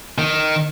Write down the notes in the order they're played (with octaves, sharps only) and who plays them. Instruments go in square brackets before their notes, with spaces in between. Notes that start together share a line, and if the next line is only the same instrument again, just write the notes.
[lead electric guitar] D#3